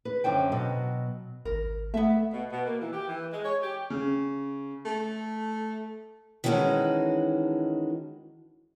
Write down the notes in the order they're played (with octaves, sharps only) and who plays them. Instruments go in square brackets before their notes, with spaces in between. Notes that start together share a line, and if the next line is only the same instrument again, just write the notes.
[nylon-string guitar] B4
F#2 D3 C5 G5
B2 F#3
[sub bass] G#1 [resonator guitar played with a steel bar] A#4
[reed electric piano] A3 [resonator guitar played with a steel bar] B3 E5
[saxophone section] B2
B2
A#3
E3
G4
E3
G#3
C#5
G4
[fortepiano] C#3
[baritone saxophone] A3
[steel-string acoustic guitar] D#3 E3 G#3 C#4 F#4 A4